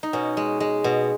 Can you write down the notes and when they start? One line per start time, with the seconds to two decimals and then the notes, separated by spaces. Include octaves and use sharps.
0.03 D#4
0.13 B2 C#4
0.37 G#3
0.60 G#3
0.84 B2